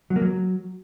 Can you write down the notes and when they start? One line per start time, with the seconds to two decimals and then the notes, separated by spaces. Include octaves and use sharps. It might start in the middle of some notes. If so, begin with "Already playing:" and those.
0.10 F#3
0.16 A#3
0.22 F#3